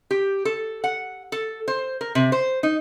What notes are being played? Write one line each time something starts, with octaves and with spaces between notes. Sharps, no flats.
G4
A4
F#5
A4
C5
A#4
C3
C5
D#4